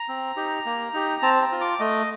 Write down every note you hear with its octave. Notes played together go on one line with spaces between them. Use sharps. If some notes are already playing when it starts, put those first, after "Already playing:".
Already playing: A#5
C4
D#4 G4
A#3
D#4 G4
C4 A5
A#5
F4
D6
A3 D#5